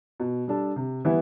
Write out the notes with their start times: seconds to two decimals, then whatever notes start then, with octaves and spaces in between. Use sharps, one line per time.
0.20 B2
0.48 G3 D4 A4
0.76 C3
1.05 E3 G3 B3 E4